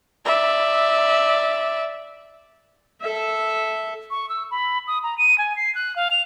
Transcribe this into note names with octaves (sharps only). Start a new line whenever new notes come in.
D5 E5
A4 E5
C#6
E6
B5
D#6
A#5
D#7
G#5
C7
F#6
F5
F7